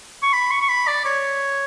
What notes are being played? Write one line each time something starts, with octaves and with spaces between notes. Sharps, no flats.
C#6
B5
C#6
C#6
B5
D5
C#5